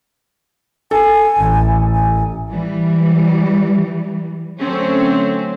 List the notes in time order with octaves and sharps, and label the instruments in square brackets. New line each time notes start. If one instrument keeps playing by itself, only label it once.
[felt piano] A4 [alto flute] G#5
[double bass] A1
[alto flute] G#5
[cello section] E3 G3
[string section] D3 F#3 A3 C4 C#4